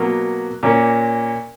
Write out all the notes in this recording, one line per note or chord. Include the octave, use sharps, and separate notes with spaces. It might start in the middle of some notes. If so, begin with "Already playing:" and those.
Already playing: B2 F#3 A#3
A#2 A#3 C#4